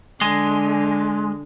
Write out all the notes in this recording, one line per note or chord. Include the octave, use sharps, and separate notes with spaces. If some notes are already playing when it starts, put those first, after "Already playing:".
D3 G#3